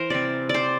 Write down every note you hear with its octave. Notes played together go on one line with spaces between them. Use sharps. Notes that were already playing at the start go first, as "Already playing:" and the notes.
Already playing: E3 A#4 C5
C3 G3 C4 D5
D5
C5